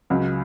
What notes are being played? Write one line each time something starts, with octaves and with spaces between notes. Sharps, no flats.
C#2 C#3 F#3